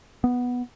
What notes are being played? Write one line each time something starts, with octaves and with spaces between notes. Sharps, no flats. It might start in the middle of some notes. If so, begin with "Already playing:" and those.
B3